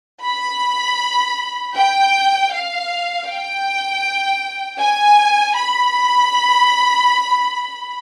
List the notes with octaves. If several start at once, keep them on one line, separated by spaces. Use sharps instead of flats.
B5
G5
F5
G5
G#5
B5